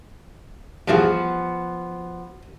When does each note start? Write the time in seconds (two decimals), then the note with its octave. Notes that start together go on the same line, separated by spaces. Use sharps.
0.88 G2 E3 F3 B3 F#4 G#4